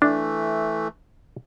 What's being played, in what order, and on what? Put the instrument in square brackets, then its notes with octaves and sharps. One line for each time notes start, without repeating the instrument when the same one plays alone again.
[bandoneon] E3 A3 [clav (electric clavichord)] D4